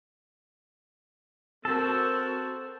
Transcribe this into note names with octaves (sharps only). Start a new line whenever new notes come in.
C4 F#4 A4 A#4 C5